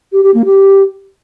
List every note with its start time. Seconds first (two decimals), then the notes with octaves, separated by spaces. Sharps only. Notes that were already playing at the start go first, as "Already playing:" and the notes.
0.12 G4
0.23 G4
0.34 A#3
0.45 G4